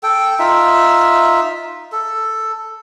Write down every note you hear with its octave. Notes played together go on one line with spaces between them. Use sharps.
A4 G5
D#4 F4 E5
A4